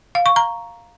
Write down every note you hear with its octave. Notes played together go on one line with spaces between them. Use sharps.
F5
C#6
A#5